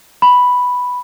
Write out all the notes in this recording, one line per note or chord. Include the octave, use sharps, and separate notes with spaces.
B5